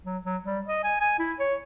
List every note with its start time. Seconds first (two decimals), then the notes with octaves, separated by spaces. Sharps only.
0.04 F#3
0.25 F#3
0.44 G3
0.68 D#5
0.84 G#5
1.01 G#5
1.19 E4
1.40 C#5